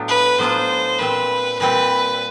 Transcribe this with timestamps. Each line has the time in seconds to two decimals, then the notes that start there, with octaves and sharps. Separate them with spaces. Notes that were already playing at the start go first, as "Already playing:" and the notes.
Already playing: A2 F#3 B3 D4 F4
0.08 B4
0.38 A2 F#3 B3 D4 F4 C5
0.98 A#2 G3 C4 B4
1.59 A#2 G3 C4 B4